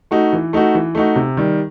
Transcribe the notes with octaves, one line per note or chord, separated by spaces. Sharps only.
A3 D#4 F#4
E3
A3 D#4 F#4
E3
A3 D#4 F#4
C3
D#3 G3